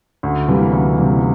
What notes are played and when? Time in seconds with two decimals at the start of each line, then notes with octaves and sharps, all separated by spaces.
0.23 D2
0.48 C3 E3 G3 A#3
0.72 D2
0.97 C3 E3 G3 A#3